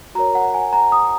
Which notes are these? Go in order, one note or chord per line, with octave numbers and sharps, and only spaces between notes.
F#4 A#4 C#5 A#5
F#5
G#5
A#5
D#6